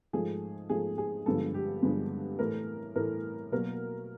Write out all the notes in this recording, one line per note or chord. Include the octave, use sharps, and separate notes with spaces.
G#2 F3 A3 G#4
G#2 F3 A3 G#4
G#4
G2 D3 F3 G#3 B3 A4
G4
G2 D3 F3 G#3 B3
A2 E3 A3 A#4
A2 E3 A3 A#4
B2 F#3 A#3 A#4